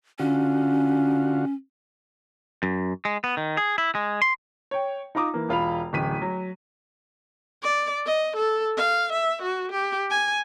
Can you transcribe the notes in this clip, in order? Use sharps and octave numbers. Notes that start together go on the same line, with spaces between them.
D3 C#4 F4 F#4
F#2
G#3
B3
D#3
G#4
E4
G#3
C6
C#5 G5
D#4 F4 A#5 D6 D#6
E3 A#3
E1 F4 B5 F7
D1 A1 B6 D#7
F#3
D5
D#5
A4
F5
E5
F#4
G4
G#5